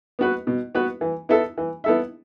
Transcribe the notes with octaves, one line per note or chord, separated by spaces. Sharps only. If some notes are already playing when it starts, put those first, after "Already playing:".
B3 F#4 B4
B2
B3 F#4 B4
E3
B3 E4 A4 E5
E3
B3 E4 A4 E5